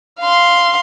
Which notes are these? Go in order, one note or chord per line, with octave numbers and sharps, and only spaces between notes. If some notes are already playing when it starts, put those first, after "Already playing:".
F5 C6